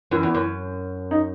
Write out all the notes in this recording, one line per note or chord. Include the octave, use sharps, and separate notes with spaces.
F#2 E3
E2
F#2
D#4